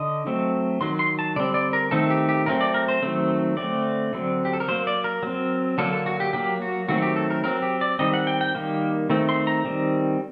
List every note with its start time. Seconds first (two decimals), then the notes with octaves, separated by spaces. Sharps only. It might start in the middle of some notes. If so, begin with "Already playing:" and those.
Already playing: D3 D#5
0.26 F#3 A3 C4
0.81 D#3 F#3 C6
0.99 C6
1.19 A5
1.36 D3 G3 C4 D5
1.54 D5
1.73 A#4
1.91 D#3 A3 C4 A4
2.10 G4
2.29 G4
2.46 F#3 A3 C4 A#4
2.61 D5
2.74 A#4
2.88 C5
3.02 D#3 F#3 A3 C4
3.57 D3 A3 C4 D5
4.13 D3 F#3 C4
4.45 G4
4.53 A4
4.60 A#4
4.68 F#3 A#3 C5
4.87 D5
5.04 A#4
5.23 F#3 C4
5.78 D3 F#3 A#3 A4
5.93 A4
6.06 F#4
6.20 G4
6.33 F#3 A#3 G4
6.62 F#4
6.89 D#3 F#3 A3 C4 F#4
7.02 G4
7.16 A4
7.30 A#4
7.44 F#3 C4 A#4
7.62 G4
7.81 D5
7.99 D#3 G3 C4 D#5
8.14 F#5
8.27 G5
8.41 G5
8.55 D#3 G3 A#3
9.10 D#3 A3 C4
9.29 C6
9.47 A#5
9.65 D#3 G3 C4